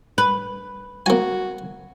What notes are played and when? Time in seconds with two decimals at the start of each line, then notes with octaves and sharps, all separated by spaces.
0.18 B4
1.06 A#3 F#4 G#5